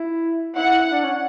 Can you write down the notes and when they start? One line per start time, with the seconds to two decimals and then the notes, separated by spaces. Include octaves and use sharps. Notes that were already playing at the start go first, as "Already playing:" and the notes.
Already playing: E4
0.56 E4 F#5
0.92 D4
1.04 C#4